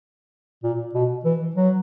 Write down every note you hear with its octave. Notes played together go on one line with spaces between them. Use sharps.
A#2
B2
E3
F#3